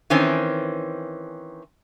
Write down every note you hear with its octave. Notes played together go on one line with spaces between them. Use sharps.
D#3 E3 C4 C#4